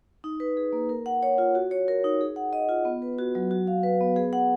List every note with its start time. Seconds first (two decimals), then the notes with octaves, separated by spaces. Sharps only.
0.24 D#4
0.40 B4
0.57 G#4
0.73 A#3
0.89 A#4
1.06 F#5
1.23 C#5
1.38 F4
1.55 F#4
1.71 C#5
1.88 A#4
2.04 D#4
2.21 G#4
2.36 F#5
2.53 D#5
2.69 F4
2.85 B3
3.02 B4
3.18 F#4
3.35 F#3
3.51 F#4
3.67 F5
3.83 B4
4.01 B3
4.16 G#4
4.33 F#5